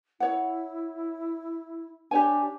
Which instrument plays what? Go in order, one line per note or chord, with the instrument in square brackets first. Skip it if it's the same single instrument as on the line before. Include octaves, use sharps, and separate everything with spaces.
[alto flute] E4 [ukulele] C#5 F#5
[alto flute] D4 [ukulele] G4 C#5 G#5